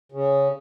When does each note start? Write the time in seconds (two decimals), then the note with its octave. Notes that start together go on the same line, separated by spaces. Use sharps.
0.12 C#3